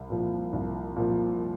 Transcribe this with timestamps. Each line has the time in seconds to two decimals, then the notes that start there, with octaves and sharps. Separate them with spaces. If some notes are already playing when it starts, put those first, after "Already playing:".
Already playing: C2
0.10 A#2 F3
0.53 C2
0.96 A#2 F3